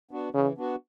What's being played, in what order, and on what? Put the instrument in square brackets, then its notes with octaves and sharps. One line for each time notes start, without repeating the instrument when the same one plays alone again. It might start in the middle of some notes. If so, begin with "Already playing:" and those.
[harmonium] B3 D4 F#4
[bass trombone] C#3 [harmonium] E3
[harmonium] B3 D4 F#4